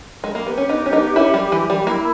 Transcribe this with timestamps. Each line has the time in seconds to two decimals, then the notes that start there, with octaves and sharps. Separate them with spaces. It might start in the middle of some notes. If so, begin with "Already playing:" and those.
0.24 G#3
0.35 A#3
0.45 B3 G4
0.57 C#4
0.69 B3 D#4
0.86 C#4
0.93 B3 D#4
1.16 C#4 E4
1.34 G3
1.52 E3
1.70 G3
1.87 A#3 E4